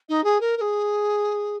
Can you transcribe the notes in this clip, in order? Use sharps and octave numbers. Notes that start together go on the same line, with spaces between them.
D#4
G#4
A#4
A#4
G#4